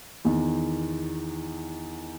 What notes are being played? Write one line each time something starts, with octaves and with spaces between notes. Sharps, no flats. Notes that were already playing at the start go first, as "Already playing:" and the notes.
E2 D#3